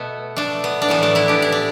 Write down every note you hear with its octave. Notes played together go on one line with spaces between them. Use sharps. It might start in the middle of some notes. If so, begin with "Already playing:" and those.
Already playing: B2 A3 B3
A3 D4
B3
D4
A2 E3 A3 B3
A3 D4
B3 E4
D4 G4
E4
D4